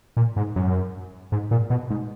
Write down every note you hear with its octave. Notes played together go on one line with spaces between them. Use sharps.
A#2
G#2
F#2
G#2
A#2
B2
G#2